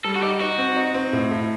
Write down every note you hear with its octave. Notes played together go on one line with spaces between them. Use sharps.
G3 A4
F#4
D#4 G4
D#4 F#4
C4
D#4
C4
A2
A2